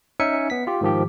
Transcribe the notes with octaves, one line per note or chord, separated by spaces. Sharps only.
C#4 D#4 E5 G#5 C#7
B3 B6
F4 G4
G#2 D#3 F3 G4